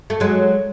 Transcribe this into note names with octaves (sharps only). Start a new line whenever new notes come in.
A3
F#3 G#3